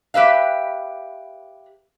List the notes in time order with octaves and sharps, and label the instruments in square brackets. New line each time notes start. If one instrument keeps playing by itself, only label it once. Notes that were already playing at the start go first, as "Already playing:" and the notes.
[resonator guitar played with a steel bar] G4 B4 E5 F5